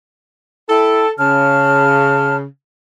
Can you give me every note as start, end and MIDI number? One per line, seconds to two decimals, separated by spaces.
0.69 1.06 64
0.69 1.11 69
0.69 1.06 79
1.19 2.44 49
1.19 2.37 81
1.19 2.37 89